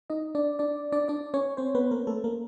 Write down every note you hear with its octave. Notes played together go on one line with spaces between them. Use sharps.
D#4 D#5
D4 D5
D4 D5
D4 D5
D4 D5
C#4 C#5
C4 C5
B3 B4
A#3 A#4
A3 A4
A#3 A#4